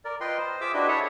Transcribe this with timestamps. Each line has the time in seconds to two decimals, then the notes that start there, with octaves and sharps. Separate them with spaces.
0.05 A#4 D5
0.21 F4 B4 D#5 G5 C6
0.38 C5
0.61 F4 G#4 E5 D6 E6
0.74 D4 E4 F#4 G4 B4 D#5
0.88 G#4 A4 C#5 E5 F#5 A5